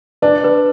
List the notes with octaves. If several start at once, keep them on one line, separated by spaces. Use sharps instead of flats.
D4 B4
B4